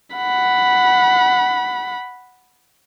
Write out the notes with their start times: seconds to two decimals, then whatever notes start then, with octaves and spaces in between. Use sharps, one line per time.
0.17 F#5 B5